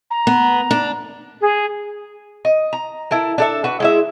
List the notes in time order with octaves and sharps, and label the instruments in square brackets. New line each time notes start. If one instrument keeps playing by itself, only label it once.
[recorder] A#5
[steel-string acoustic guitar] B3
D4
[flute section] G#4
[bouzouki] D#5
A#5
E4 A4 A#4
D4 A4 E5
F#4 B4
G#3 E4 E5